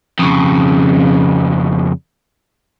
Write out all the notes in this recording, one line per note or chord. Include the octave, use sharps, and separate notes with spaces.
F2 C#3